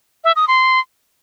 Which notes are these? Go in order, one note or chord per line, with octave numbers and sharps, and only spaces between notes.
E5
D#6
C6